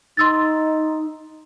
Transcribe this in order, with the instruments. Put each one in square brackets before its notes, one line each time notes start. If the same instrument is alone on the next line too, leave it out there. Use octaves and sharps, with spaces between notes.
[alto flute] D#4 [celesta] C6 E6 A6